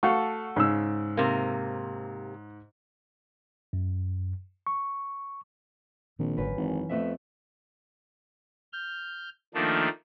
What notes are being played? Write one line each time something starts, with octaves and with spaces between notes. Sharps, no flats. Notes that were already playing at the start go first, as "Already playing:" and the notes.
A3 F#4 A4 F5 C#6
G#2 C#3 E6
C3 A#3
F#2
C#6
A#1 A#2 D#3 C4
G#1 F#2 D3 B4
G#1 E3
F2 A3 B3 E5
F6 G6
D#3 F3 A3 A#3 D4